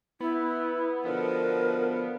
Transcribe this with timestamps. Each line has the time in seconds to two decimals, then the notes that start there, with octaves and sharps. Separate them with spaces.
0.20 B3 E4
1.05 B2 D3 F3 B3 A#4